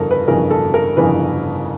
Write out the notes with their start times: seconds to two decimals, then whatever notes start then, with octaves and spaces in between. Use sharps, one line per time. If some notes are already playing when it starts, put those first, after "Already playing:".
Already playing: G1 F2 C#3 E3 A4 A#4
0.11 B4
0.28 G1 F2 C#3 E3 A#4
0.51 A4
0.74 A#4
0.97 G1 F2 C#3 E3 B4